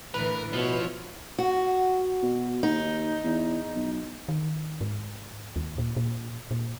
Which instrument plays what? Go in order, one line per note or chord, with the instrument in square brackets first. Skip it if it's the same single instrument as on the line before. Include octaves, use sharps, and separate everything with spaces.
[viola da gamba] A2 D3 E3 [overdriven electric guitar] A#4 [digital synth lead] B4
[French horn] B2 [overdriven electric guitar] F3 [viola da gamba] E4 C#5
[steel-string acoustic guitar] F#4
[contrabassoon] B2
[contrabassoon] D#2 [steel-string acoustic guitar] D#4
[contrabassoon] E2
B1
[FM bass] D#3
G#2
D#2
A#2
A#2
A#2